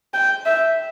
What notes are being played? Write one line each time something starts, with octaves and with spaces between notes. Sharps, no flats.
G5
E5